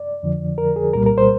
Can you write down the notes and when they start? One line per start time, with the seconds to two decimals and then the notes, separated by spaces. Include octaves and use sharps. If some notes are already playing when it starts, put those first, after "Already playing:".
Already playing: D5
0.23 F2 D3 F3
0.58 A#4
0.76 G#4
0.93 C2 A#2 G3 A#4
1.06 A#4
1.18 C5